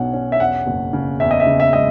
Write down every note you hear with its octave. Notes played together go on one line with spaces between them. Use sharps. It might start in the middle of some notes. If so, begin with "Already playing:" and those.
Already playing: B1 B2 C#4 F#5
C#4
E5
E2 F#5
F#1
C#3
E2 E5
D#5
E5
C#3
E5
G#3 D#5